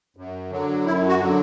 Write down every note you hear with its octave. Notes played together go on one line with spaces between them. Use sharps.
F#2
D3 F#3
F#2 E4
F#4
D3 F#3